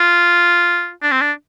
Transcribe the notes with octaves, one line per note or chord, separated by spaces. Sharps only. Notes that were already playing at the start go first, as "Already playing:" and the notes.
Already playing: F4
D4
C4
D4